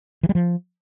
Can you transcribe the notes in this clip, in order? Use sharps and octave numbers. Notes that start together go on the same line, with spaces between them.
E3
G3
F3